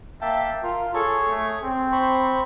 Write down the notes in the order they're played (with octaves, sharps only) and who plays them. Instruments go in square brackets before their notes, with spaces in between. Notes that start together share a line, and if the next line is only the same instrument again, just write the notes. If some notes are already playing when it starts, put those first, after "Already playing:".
[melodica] A#3 G5 A5 [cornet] E5
[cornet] F4 [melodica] A#4
[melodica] G#4 C#5 C#6 [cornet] A4
[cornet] A3
C4
[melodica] C5 B5 C#6